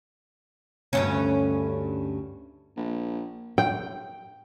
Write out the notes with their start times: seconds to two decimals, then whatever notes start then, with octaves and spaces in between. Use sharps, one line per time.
0.93 D2 G2 C#4
2.76 A#1
3.58 G5